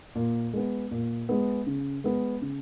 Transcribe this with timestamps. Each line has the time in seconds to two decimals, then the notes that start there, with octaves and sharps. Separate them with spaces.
0.15 A#2
0.54 G#3 B3
0.91 A#2
1.29 G#3 B3
1.66 C#3
2.04 G#3 B3
2.42 C#3